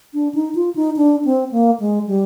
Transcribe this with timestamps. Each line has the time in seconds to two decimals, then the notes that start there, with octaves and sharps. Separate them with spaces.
0.14 D4
0.34 D#4
0.55 F4
0.76 D#4
0.97 D4
1.25 C4
1.51 A#3
1.80 G#3
2.07 G3